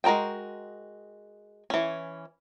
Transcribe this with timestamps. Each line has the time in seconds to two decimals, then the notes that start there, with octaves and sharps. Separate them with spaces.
0.04 G#3 F#4 A#4 C5 G5
1.70 E3 C#4